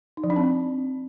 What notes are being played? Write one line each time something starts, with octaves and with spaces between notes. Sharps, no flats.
D#4
F3
D4
C4